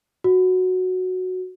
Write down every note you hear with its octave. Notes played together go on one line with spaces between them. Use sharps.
F#4